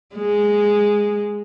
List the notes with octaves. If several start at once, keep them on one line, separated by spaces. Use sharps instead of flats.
G#3